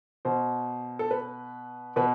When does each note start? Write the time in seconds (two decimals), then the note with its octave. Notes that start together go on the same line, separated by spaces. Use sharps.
0.25 B2 C5
0.99 A4
1.11 B4
1.96 B2 B4